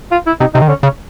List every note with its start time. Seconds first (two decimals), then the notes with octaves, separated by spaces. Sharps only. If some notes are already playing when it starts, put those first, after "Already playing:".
0.12 F4
0.27 E4
0.40 C3 D#4
0.54 C3 D#4
0.62 D#3
0.68 D3 C#4
0.83 C#3 C#4